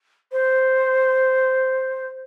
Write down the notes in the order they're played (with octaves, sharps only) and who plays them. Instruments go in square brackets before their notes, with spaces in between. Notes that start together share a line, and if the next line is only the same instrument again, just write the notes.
[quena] C5